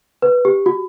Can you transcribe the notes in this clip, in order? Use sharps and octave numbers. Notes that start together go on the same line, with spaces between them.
B4
G4
F#4